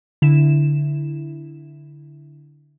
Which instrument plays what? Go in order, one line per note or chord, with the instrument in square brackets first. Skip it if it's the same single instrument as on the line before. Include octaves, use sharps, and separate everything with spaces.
[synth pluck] D3 E4 E7